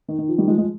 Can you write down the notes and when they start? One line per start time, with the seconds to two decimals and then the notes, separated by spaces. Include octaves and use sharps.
0.08 D#3
0.19 D#3
0.28 F3
0.38 D#3 G3
0.48 F3 G#3
0.58 F3 G#3